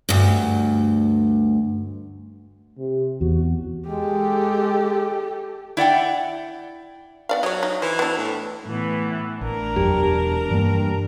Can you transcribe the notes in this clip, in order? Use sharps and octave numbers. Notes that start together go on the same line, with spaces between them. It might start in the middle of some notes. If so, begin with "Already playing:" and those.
D2 G2
C3
E2 F#4
G#3 G4 A4
E4 D5 F#5 G5
B3 D5 F5
F#3 C#5 D#5
D#4
E3 C5
B3 D4
A2
A2 E3 B3
A1 D4 A#4
E1 F#2 G4
G2 E3 A#3